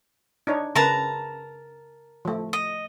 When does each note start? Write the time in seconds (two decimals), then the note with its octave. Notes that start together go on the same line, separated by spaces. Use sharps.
0.47 D4 D#4 C#5
0.75 C#3 A#4 B4 A5 A#5
2.25 F3 A3
2.53 D#5